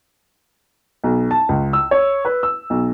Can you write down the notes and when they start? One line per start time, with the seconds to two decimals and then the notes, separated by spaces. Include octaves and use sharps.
1.04 B1
1.31 A5
1.49 C#2
1.73 E6
1.91 C#5
2.25 B4
2.43 E6
2.70 B1